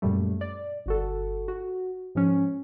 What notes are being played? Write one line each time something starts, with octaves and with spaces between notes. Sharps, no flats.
F#2 A#2 G3 A3
D5
G1 F#4 A4
F#4
G#2 F3 C#4